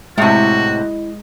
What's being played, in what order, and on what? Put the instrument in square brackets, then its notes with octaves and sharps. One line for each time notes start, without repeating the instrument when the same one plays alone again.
[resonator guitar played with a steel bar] A2 C3 [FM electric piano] G#3 D#5 [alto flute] E4 [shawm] F#4